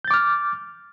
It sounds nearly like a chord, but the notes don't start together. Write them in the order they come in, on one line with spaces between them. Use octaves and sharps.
G6 A6 D6 F6